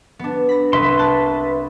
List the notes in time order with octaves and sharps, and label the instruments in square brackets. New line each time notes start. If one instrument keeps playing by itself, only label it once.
[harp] B3 D4
B5 A#6
[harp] C2 [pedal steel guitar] B4 E5 C6
[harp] A5 F#6